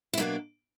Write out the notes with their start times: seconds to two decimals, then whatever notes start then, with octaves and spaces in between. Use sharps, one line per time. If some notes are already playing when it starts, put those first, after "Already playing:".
0.13 E4
0.17 B2 F#3 A#3 D4 D#4